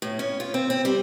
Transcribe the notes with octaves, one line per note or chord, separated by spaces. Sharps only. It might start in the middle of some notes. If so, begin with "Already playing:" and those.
A2
C#4
F4
C4
C4
G3